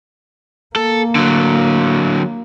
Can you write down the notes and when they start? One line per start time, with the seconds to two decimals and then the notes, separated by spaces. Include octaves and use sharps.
0.76 A#3 A4
1.15 D3 F#3